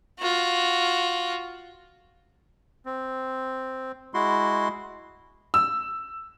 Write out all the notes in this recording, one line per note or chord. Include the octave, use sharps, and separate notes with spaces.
F4 F#4
C4
G#3 E4 F#4 C6
E6